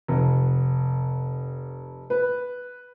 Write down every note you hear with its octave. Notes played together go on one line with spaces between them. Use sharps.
F1
B4